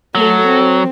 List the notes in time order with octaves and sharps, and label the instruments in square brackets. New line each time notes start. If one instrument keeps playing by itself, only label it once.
[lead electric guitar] F#3 [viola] A3 A4
[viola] C4